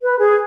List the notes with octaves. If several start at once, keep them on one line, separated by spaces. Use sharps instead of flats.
B4
G#4